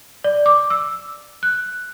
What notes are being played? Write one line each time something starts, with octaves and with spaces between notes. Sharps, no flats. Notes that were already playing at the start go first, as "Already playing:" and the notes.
D5
D6
E6
F#6